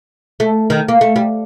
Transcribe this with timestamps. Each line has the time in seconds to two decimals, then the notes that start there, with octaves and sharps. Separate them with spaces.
0.40 A3
0.70 D#3
0.88 A#3
1.01 A3
1.16 G3